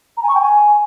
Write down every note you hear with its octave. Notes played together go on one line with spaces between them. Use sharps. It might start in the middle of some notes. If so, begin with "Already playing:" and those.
A#5
G#5
C#6
G5
G#5